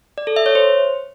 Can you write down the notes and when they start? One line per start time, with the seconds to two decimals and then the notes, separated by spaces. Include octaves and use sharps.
0.18 D5
0.27 A4
0.36 E5
0.46 C#5
0.55 C5